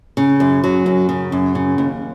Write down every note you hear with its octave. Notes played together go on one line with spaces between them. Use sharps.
C#3
F#2
F#3
F#2
C#3
F#2
C#3
D#2